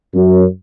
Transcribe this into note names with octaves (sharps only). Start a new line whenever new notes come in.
F#2